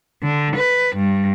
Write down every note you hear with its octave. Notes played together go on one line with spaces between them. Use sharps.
D3
B4
G2